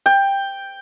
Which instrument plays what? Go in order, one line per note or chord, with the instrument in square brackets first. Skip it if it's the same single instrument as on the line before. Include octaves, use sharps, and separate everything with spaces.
[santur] G5